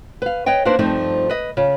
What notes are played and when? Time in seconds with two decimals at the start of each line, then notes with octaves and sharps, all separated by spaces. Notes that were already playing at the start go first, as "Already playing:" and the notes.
0.22 B4 F5
0.46 B4 C#5 D#5 G5
0.65 A#3 D4 D#4 B4 C5
0.79 G2 F3 A3 C4 D#4
1.29 B4 D#5
1.57 C#3 F4